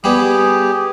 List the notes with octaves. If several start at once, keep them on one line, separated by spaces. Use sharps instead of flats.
G3 B3 G4 G#4